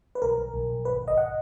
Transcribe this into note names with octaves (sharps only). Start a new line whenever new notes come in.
B4
B1 A#4
B1
B1
B1
G#1 B4
G#1
D#5
F#5